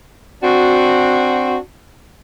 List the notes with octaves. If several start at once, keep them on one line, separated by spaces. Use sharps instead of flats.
C4 D4 F#4